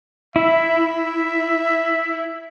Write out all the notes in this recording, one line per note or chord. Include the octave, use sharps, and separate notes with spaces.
E4 E5